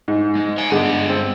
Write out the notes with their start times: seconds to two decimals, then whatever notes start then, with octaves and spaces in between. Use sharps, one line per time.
0.08 G#2
0.35 G#3
0.58 F5 G#5
0.72 G2 D3 G#3 B3
1.09 C4